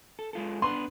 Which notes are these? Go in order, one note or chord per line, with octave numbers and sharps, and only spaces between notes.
A4
G#3 F4 A4
B3 D4 B4 C6